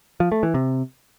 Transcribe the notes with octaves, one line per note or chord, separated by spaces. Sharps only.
F3
A3
E3
C3